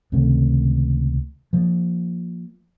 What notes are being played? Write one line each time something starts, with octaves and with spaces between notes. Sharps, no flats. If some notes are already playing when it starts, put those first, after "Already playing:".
C#2 C3 D#3 A3
F3 A#3